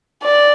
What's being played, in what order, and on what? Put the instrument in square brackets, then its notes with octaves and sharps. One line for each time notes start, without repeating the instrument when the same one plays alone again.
[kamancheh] D5